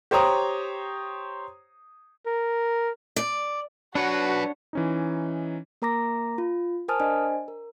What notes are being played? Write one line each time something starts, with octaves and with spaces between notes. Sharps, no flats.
G4 C5 C#5 A#5 D#6
A#4
D5
F#3 D4 F#4 B4 C#5 F#5
E3 C#4 D#4
A#3 A#4 A#5 D6 A#6
F4
A#4 C5 G#5 A5 D#6 F6
D4 C5 D5 D#5 G#5
A#4